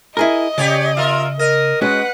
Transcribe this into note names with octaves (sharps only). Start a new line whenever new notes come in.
E4 G#4 A#4 D#5
C#3 G4 C#5 D5
F4 A#4 E5
A#4 D#5
G#3 C#4 F#4 B4 F#5